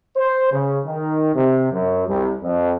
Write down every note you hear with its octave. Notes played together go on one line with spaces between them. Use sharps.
C5
C#3
D#3
C3
F#2
C2
F2